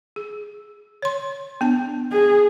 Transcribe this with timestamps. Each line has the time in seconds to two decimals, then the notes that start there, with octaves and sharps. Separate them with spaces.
0.16 G#4
1.02 C#5 C6
1.61 B3 D4 A5
2.12 G#4